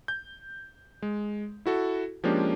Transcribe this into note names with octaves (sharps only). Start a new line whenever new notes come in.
G6
G#3
E4 F#4 A4
F3 G#3 A#3 C#4 D4 G4